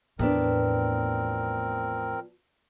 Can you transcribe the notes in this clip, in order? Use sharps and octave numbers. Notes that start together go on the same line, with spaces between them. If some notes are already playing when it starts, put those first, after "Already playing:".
E2 A2 F3 B3 C4 D4 A#4